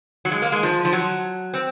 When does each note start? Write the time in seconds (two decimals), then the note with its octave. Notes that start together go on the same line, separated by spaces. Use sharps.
0.25 F#3
0.32 G#3
0.42 A#3
0.52 G#3
0.63 F3
0.85 F3
0.93 F#3
1.54 C4